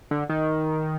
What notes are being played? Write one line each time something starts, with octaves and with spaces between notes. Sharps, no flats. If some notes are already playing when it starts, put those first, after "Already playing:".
D3
D#3